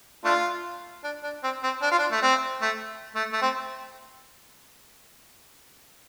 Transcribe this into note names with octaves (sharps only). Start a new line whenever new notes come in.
A3 D4 F4
D4
D4
C4
C4
D4
F4
D4
A3
C4
A3
A3
A3
C4